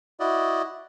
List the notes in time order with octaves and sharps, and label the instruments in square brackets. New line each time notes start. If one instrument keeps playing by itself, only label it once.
[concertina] E4 F#4 D5 D#5